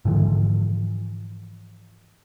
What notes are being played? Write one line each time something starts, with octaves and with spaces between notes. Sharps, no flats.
G#2 D3 E3 F3